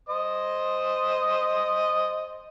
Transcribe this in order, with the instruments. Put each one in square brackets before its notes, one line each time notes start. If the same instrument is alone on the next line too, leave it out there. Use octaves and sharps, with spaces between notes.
[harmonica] C5 D#5 D#6